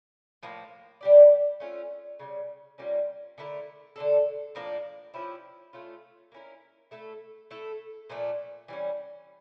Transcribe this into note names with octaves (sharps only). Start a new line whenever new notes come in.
A2 F3 A#3
G3 D4 G4 D5
A3 C#4 F4
C#3 E3 G3
G3 A#3 C#4 F4
D3 A3 E4 A#4
D3 A3 D4 A4
A2 F3 A#3 D4
F3 C#4 E4 G4
A3 C#4 F4
A#3 C#4 E4 A#4
A3 E4 A4
A3 E4 A4
A#2 F3 A3 D4
E3 G3 C#4